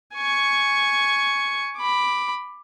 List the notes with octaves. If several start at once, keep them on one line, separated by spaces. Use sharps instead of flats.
G#5 C#6
B5 D6